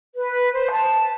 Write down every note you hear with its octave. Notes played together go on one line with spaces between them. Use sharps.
B4
C5
A5